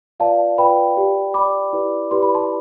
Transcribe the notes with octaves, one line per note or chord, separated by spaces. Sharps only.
F4 B4 D5 F5 A5
F4 B4 D5 G5 B5
G4 D5
G4 D5 B5 D6
E4 G4 B4 D5
E4 G4 B4 D5 C6
B5
A5 C6